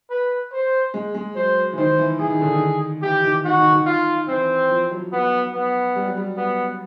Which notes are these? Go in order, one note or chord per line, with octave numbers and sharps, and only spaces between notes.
B4
C5
G#3
G#3
F#3 C5
E3
D#3 C5
E3
E3 G#4
D#3
D3
D#3
E3 G4
D#3
D#3 F#4
D#3
D#3
F4
E3 C4
F3
F#3
B3
B3
G3
F#3
G3
B3